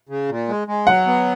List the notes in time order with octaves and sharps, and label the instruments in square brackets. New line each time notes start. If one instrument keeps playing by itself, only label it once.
[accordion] C#3
A#2
G#3
G#3
[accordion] F#3 [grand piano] F#5
[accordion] B3